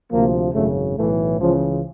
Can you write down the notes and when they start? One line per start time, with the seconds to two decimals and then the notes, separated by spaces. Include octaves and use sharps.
0.11 D2 C3 F3 A#3
0.54 G#1 F#2 C#3 A3
0.97 B1 A2 E3 A3
1.39 C#2 C#3 E3 F3